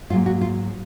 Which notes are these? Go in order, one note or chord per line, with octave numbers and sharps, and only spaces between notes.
G#2 F#3 A#3 F4
F#4
F4